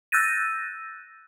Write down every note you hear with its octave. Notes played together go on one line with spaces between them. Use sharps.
E6 F#6 G6 A6 A#6 D#7